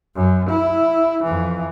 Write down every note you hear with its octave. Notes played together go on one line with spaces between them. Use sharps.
F#2
E4
F2 E3